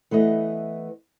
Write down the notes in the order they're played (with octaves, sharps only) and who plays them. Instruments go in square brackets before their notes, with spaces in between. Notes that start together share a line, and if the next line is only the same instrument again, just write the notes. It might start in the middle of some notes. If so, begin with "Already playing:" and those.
[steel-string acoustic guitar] E3 A3 B3 D#5